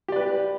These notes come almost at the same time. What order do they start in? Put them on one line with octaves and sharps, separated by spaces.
G4 D5 B4